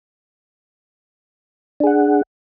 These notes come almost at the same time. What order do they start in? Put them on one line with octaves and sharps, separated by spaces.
D4 G#4 F#5